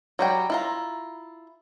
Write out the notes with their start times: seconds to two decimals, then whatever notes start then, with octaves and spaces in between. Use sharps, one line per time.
0.19 F#3 G3 G5
0.50 E4 F4 A#5